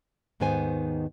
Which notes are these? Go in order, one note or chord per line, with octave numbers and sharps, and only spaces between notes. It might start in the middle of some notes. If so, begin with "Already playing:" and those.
D#2 G#2 D#3 B3 C5 G#5